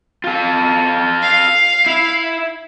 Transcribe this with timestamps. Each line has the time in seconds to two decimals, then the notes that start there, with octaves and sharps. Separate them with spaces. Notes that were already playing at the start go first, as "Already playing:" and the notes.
0.24 F4 A4
1.22 F5
1.86 E4